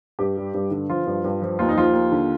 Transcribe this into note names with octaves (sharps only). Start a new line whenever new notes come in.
G2 G4
G3
G2
D3
F3 F4
G2
G2
F3
D#2 F4
D#4
F3 F4
D#2
D3